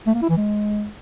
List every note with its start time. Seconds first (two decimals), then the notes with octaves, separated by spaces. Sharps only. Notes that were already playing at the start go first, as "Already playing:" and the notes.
0.07 A3
0.14 A#3
0.22 E4
0.29 E3
0.37 G#3